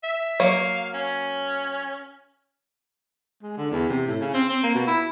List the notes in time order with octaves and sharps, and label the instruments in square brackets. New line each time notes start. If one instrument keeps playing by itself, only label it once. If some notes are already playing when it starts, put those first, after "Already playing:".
[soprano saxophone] E5
[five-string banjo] F#3 A#3 [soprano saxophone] F5
[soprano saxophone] C#4
[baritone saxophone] G#3
D3
E2
C3
A2
C#3
C4
C4
A#3
B2
E4